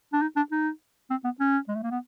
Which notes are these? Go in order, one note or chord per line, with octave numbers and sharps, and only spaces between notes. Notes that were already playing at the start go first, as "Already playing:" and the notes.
D4
D#4
D4
D#4
C4
B3
C#4
G#3
A3
A#3
B3